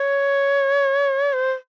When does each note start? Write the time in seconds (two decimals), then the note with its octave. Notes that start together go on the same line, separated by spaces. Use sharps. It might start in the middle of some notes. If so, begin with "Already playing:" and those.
Already playing: C#5
1.33 C5